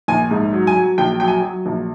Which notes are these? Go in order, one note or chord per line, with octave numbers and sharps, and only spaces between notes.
A#1 G#5
G#2
F#3
G#5
F#3
A#1 G5
F#3 G5
G#5
F#3
A#1